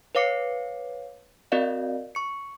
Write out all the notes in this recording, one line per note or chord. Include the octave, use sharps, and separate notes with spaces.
B4 C#5 F5 D6 C7 C#7
C4 F#4 A#4 D5 D#5 F5
C#6 C#7